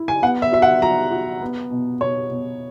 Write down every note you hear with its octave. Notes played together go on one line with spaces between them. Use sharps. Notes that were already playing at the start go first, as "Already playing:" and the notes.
Already playing: E4
G#5
B3 F#5
E5
F#4 E5
F#5
F#4 A#5
F#4
B3
B2
B2 C#5
B2